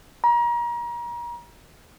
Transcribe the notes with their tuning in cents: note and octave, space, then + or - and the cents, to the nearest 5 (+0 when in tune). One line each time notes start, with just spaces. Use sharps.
A#5 +35